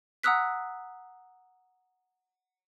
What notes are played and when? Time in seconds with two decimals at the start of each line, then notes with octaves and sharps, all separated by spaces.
0.23 F#5 A#5 D#6 E6 F#6 B6